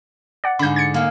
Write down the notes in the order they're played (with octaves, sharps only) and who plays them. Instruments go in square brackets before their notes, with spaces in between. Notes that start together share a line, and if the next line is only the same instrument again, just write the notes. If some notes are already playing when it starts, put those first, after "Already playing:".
[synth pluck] D5 F#5
[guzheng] G#2 D3 [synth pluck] B5 G6
[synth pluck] G#6 A6 C#7
[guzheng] G#3 A#3